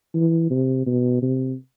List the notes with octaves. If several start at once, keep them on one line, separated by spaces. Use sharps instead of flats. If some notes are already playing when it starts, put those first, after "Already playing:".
E3
C3
B2
C3